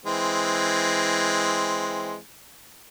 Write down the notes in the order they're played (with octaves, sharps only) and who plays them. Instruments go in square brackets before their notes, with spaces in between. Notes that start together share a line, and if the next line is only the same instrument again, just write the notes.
[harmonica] E3 G#3 C4